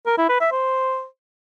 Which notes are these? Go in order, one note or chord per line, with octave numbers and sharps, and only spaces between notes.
A#4
E4
B4
E5
C5